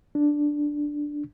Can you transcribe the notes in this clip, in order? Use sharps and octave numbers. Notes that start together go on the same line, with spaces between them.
D4